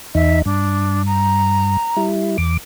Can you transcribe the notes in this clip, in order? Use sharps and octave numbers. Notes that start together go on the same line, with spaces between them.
E2 D#4 E5
G2 D4
A#5
G3 E4
E2 D6